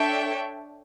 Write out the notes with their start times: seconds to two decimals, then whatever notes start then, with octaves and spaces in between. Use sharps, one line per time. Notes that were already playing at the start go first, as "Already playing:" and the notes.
Already playing: D4 A4 C#5 E5 G5